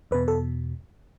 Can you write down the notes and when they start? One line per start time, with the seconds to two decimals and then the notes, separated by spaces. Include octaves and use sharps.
0.11 E2 B2 B4
0.28 A4